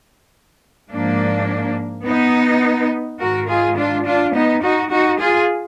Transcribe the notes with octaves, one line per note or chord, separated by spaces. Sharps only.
G#2 F3 A#3 D4
B3 D#4
G#2 D#3 F#4 A#4
F4 G#4
D4 F4
D4 F4
B3 D#4
D#4 F#4
D#4 F#4
F4 G#4